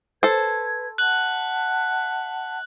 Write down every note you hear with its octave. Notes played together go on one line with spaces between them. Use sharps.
A4 B4 C5 G#6
E5 F#5 A5 F#6 F#7